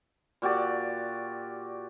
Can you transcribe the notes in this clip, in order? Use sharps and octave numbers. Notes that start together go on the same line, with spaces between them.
A#2 F#4 G4 D5